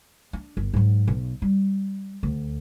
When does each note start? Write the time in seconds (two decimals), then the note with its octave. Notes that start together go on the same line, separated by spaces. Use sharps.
0.33 D4
0.57 G1
0.74 G#2 F#3
1.08 B1
1.42 G3
2.23 D2